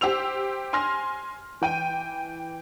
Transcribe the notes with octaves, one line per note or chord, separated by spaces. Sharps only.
G4 C5 E6 F7
G#5 C6 F6 A#6
E3 G5 D#7